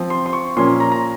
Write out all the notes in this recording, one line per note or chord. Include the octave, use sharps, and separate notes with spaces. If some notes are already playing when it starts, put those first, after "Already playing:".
Already playing: F3 C4
C6
C6
C#6
A#2 F3 A#3 C#4 C6
A#5
A#5